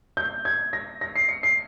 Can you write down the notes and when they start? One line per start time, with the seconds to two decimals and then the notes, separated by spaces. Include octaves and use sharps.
0.17 G6
0.45 G#6
0.73 A#6
1.01 A#6
1.15 C7
1.29 C#7
1.43 C7